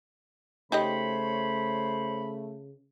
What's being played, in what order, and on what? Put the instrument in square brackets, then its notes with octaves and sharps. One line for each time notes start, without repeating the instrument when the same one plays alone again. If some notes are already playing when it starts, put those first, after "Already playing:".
[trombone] C#3 [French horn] A3 [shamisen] D#4 G4 D#5 [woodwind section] C5 C#5 B5